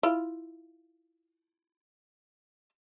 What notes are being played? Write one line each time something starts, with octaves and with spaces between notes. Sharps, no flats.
E4 F4